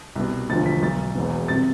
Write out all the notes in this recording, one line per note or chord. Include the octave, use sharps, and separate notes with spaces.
C2 B2
E1 D2 D3 F3 A6
B6
B1 B2 A6
E1 E2 B2
G1 C3 A6